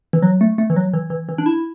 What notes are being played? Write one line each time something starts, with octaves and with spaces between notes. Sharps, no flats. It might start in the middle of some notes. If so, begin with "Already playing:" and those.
E3
F#3
A3
A3
E3
F#3
E3
E3
E3
D4
E4